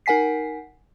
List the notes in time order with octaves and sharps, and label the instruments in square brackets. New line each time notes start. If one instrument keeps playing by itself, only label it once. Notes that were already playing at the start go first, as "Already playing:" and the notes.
[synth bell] D#4 A#4 F#5 G#5 B6 C7